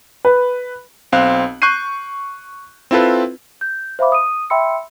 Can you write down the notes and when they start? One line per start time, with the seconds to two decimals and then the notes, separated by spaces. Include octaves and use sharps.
0.25 B4
1.12 B1 C4 F5 F#6
1.62 C#6 F#6 G6 C7 D#7
2.91 C4 E4 F4 A4 B4
3.61 G6
3.99 C5 E5 F5 B5 D6
4.12 D#6 D#7
4.50 E5 G5 B5 C6 E6 C#7